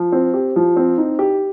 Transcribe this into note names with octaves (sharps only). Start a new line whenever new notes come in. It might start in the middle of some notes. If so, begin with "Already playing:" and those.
Already playing: F3
C4
G4
F3
C4
D#4
G4